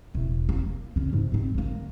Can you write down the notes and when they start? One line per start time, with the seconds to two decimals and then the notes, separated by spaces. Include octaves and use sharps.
0.15 E1
0.49 A#3
0.96 D3 C#4
1.13 G#2
1.32 G#2 C4
1.54 D2 A#3